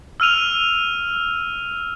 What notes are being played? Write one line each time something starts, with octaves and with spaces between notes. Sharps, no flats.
E6 F6 D#7 F7